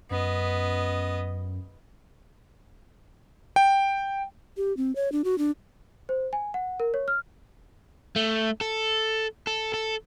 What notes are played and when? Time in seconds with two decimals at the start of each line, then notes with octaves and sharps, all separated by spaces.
0.10 F#2 B3 D#5
3.56 G5
4.57 G4
4.77 C4
4.95 C#5
5.12 D4
5.24 F#4
5.38 D4
6.09 C5
6.33 G#5
6.54 F#5
6.80 A#4
6.94 C#5
7.08 F6
8.16 A3
8.61 A4
9.47 A4
9.74 A4